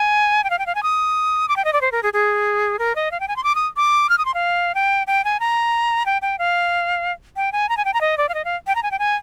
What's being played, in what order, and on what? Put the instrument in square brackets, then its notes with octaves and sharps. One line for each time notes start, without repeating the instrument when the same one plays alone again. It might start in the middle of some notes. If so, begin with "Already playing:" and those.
Already playing: [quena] G#5
G5
F5
G5
F5
G#5
D#6
D6
G5
D#5
D5
C5
A#4
G#4
G#4
A#4
D#5
F5
G5
G#5
C6
D6
D#6
D6
F6
D#6
C6
F5
G5
G5
G#5
A#5
G5
G5
F5
G5
G#5
A#5
G#5
G5
A#5
D#5
D5
F5
D#5
F5
G5
A#5
G#5
G5
G#5